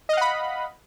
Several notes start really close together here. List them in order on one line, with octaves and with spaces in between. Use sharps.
D#5 F5 F#5 B5